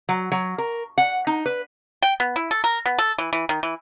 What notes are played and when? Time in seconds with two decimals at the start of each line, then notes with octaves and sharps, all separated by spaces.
0.09 F#3
0.32 F#3
0.58 A#4
0.98 F#5
1.27 D#4
1.46 B4
2.02 G5
2.20 B3
2.36 E4
2.51 A4
2.64 A#4
2.86 B3
2.99 A4
3.18 E3
3.33 E3
3.49 D#3
3.63 E3